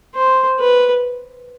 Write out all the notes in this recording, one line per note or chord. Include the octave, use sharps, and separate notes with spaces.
C5
B4